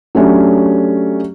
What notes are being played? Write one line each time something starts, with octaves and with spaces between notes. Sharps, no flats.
F#3 A3 C#4 D4 G4